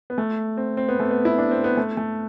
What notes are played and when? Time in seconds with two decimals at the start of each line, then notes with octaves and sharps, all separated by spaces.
0.10 B3
0.18 A3
0.57 C4
0.77 C4
0.89 B3
1.00 A3
1.11 B3
1.25 E4
1.38 D4
1.51 C4
1.64 B3
1.77 A3
1.97 A3